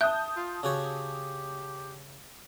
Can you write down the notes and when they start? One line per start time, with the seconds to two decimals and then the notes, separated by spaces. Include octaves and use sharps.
0.01 E5 A5 D#6 F#6 G6
0.36 F4
0.63 C#3 F#4 G4 C#5